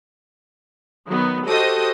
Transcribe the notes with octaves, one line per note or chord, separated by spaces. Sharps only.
D#3 F#3 B3
F#4 G4 A4 C5 D#5 D#6